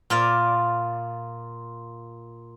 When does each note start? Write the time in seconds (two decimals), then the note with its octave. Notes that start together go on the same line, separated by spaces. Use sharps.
0.10 A#2 F4 D5